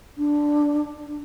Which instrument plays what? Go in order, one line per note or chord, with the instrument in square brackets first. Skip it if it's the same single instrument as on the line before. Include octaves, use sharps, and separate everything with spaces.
[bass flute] D4